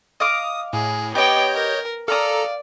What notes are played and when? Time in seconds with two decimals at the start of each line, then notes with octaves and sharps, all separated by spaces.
0.20 D#5 F5 D6 D#6
0.73 A2 G#4
1.15 B3 G4 C#5 D#5 G5 D6 G6
1.55 A#4
2.08 A4 D5 F5 A#5 D#6